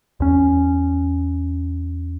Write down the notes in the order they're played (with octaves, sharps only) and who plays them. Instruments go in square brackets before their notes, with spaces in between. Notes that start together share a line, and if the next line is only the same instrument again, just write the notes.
[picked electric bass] E2 C#4